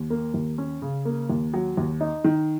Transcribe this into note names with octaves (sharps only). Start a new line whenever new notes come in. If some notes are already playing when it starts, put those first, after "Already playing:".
Already playing: D#2
A#3
D#2
C#4
C#3
A#3
D#2
F#3
D#2
D#4
D#3